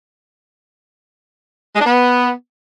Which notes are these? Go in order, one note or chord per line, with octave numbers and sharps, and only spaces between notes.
G#3
D4
B3